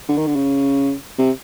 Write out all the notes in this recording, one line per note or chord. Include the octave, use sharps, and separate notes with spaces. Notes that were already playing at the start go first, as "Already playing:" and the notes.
D3
D#3
D3
C#3
C3